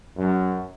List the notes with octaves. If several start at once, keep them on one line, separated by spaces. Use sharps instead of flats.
F#2